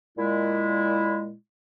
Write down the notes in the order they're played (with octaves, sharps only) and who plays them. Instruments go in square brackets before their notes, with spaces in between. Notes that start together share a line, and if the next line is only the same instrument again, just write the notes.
[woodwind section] A#2 G#3 E4